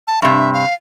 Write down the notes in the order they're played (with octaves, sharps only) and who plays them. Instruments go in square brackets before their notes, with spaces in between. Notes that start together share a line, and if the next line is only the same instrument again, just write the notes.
[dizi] A5
[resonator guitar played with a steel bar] G2 C3 [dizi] E5
[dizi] F5